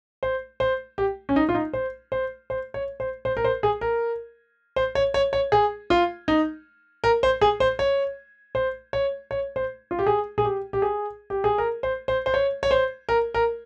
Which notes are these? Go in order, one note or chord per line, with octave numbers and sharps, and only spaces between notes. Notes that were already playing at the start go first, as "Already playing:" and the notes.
C5
C5
G4
C#4
D#4
F4
D#4
C5
C5
C5
C#5
C5
C5
A#4
C5
G#4
A#4
C5
C#5
C#5
C#5
G#4
F4
D#4
A#4
C5
G#4
C5
C#5
C5
C#5
C#5
C5
F4
G4
G#4
G#4
G4
G4
G#4
G4
G#4
A#4
C5
C5
C5
C#5
C#5
C5
A#4
A#4